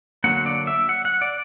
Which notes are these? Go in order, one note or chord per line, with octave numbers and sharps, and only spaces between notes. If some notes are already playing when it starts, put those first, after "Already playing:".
D3 F#3 A#3 F#5
D5
E5
F#5
F#5
D5